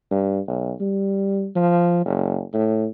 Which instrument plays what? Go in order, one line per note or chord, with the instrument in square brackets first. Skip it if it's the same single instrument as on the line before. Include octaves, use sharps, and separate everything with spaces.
[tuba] G2
B1
G3
F3
F#1
A2